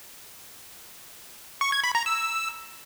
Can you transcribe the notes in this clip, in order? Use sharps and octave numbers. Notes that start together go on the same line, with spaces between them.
C#6
G#6
B5
A#5
E6